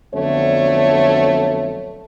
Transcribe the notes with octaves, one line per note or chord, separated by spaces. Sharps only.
F2 D3 F#3 A3 B3 C#5